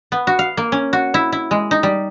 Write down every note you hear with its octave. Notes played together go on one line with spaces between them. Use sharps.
B3
F#4
F5
A#3
C#4
F#4
E4
E4
G#3
D#4
G3